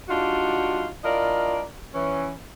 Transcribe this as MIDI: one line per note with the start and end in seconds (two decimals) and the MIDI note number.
0.09 0.88 55
0.09 0.88 62
0.09 0.88 63
0.09 0.88 65
0.09 0.88 66
1.04 1.62 62
1.04 1.62 64
1.04 1.62 65
1.04 1.62 70
1.04 1.62 74
1.04 1.62 75
1.94 2.31 52
1.94 2.31 61